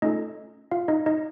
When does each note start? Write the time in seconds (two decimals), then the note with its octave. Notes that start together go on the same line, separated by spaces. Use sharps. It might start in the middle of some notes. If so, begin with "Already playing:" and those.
0.02 A3 C#4 D#4 F4 A4 D#5
0.71 F4 F5
0.88 D#4 D#5
1.06 D#4 D#5